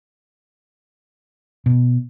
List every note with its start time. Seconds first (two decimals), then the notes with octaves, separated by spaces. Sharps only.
1.66 B2